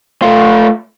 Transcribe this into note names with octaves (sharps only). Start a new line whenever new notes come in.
A3 F4